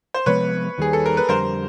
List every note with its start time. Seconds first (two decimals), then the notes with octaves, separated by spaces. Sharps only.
0.14 C5
0.26 C3 F3 G#3 B3 B4 C#5
0.78 D#2 D#3 G3 G#4
0.93 A4
1.06 A#4
1.17 B4
1.29 F2 D3 G3 A#4 C5